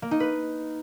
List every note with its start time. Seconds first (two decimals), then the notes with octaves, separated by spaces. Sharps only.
0.02 A#3
0.11 D#4
0.20 B4